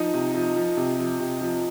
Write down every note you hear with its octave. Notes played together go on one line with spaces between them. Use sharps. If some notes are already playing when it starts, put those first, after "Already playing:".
Already playing: F3 D#4 D#5
C3
F3
F3
C3
F3
C3
F3